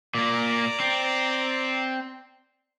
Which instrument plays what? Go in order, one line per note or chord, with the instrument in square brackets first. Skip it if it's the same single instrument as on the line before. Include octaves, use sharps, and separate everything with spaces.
[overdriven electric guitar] A#2 A#3 [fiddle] D5 A#5
[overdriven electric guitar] C4